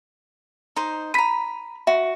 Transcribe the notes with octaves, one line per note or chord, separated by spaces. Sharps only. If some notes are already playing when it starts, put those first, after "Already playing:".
D#4 C5
A#5 B5 B6 D#7
F#4 E5